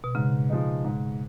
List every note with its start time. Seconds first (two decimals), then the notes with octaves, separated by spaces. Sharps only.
0.04 B2
0.15 G#2 C#3
0.50 F3 G#3 D#4
0.85 G#2